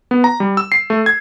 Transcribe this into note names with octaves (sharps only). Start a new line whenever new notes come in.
B3
A#5
G3
E6
C7
A3
G#6